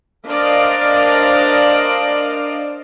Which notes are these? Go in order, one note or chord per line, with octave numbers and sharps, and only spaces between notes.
D4 A#4 C5 D5 D#5 F5